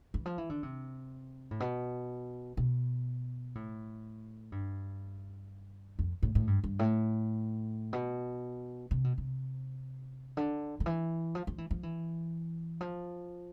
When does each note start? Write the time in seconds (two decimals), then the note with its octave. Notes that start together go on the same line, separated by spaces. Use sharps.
0.14 E3
0.26 F3
0.38 E3
0.49 D3
0.63 C3
1.51 A2
1.60 B2
2.57 B2
3.55 A2
4.52 G2
5.99 F2
6.23 A2
6.35 A2
6.47 G2
6.64 G2
6.79 A2
7.93 B2
8.91 C3
9.04 B2
9.18 C3
10.37 D3
10.80 D3
10.86 E3
11.35 F3
11.47 F3
11.58 E3
11.71 F3
11.83 E3
12.81 F3